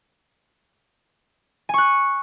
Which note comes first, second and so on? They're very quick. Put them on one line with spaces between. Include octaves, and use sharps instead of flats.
G#5 C#6 F#6